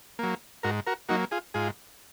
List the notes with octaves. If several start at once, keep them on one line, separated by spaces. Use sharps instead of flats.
F#3 A#3
G#2 F#4 A#4
F#4 A#4
F#3 A#3 D#4 F#4
F4 G#4
G#2 F4 G#4